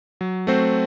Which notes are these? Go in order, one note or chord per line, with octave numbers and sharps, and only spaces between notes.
F#3
A3 C4 F#4 C5